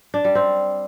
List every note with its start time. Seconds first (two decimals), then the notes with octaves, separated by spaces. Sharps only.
0.14 D4
0.24 G3
0.35 C4